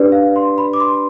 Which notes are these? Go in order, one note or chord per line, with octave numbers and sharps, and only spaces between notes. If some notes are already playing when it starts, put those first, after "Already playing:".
Already playing: D4 G4 B4 D5
F5
C6
B5
D6
C6